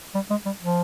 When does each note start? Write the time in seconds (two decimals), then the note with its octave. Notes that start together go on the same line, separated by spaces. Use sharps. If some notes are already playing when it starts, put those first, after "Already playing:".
0.15 G3
0.30 G#3
0.46 G3
0.61 F3